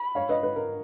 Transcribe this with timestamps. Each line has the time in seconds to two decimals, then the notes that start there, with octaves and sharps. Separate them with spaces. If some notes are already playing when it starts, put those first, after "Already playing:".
Already playing: B5
0.15 C#5 F5
0.29 B4 D#5
0.43 B4
0.56 A#4